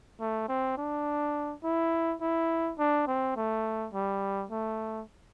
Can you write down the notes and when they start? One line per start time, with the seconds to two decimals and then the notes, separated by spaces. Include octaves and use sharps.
0.20 A3
0.48 C4
0.77 D4
1.64 E4
2.21 E4
2.78 D4
3.07 C4
3.36 A3
3.93 G3
4.51 A3